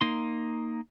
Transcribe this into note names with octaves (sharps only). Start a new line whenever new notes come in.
A#3 D#4 C6